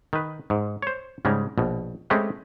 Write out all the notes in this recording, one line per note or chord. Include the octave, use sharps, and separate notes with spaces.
D#3 B4
G#2
C5 C#5
G#2 C#3 G3 G#3
A#1 B2
G#3 A3 C4 C#4 G4 B4